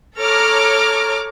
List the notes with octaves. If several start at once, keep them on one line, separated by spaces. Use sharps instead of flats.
A4 C#5 A#5 D6 F6